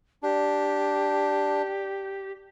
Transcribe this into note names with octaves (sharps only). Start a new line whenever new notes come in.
D4 G4